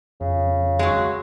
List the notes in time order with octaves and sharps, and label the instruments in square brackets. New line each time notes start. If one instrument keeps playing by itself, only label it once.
[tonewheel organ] F2 [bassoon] C#3
[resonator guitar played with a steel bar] F#3 G#3